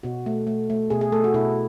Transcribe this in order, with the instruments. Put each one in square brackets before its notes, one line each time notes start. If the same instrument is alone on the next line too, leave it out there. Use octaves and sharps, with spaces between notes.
[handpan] B2 F#4
A3
A3
A3
B2 G#4
G#4
A3 A4
F#4
B2 E4